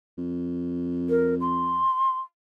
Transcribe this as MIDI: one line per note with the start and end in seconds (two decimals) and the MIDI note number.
0.18 1.85 41
1.09 1.35 70
1.41 2.18 84